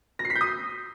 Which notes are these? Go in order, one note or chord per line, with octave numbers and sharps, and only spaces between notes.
A#6
C7
B6
G6
D#6